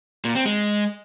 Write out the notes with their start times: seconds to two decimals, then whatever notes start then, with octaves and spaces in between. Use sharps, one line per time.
0.25 A#2
0.35 C4
0.45 G#3